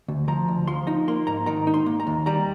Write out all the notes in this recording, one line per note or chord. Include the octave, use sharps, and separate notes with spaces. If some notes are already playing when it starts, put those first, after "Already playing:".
D2
F3 A#5
D2
F3 C6
D#4 A#5
A#3 C6
G#2 A#5
D#3 A#5
D#4
C6
A#3
A#5
D#2
G3 A#5